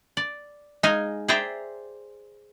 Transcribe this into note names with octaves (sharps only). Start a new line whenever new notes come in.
D5
G#3 D#4 D#5 F5 G#5
G#4 C5 D5 E5 G5 A#5